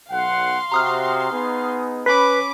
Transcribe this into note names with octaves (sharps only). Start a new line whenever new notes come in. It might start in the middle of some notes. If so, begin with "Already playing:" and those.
B1 F5 F#5 C6
C3 F#4 A#5 D#6 F6
B3 D#4 G#4
C#4 B4 B5 D6 B6